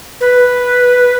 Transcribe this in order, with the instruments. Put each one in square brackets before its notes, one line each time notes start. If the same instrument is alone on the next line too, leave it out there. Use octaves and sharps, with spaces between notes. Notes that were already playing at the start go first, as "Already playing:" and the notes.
[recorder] B4